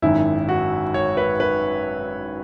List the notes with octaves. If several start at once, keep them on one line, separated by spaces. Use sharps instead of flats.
G#1 F#2 D#3 E4
F#4
C#5
B4
B4